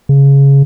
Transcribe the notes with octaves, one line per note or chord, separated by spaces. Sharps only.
C#3